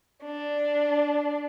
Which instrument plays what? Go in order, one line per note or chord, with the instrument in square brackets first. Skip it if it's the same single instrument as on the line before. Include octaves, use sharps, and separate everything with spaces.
[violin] D4